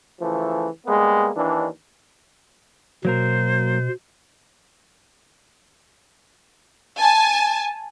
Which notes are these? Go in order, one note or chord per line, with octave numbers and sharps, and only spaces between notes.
C#3 E3 F3 A3
G3 G#3 A#3 B3
D#2 E3 D4
B2 F#3 A#3 A#4 C5
G#5 A5